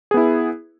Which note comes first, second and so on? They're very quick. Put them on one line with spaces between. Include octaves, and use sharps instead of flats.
G#4 B3 E4